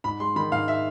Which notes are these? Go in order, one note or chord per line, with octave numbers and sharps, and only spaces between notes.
G#2 B5
G#3 C6
D#3 B5
G#2 F5
E5